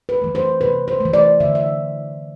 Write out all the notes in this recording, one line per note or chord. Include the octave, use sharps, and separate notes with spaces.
B4
E3 A3
C5
C3 B4
C5
E3 A3
D5
D3 E5
E5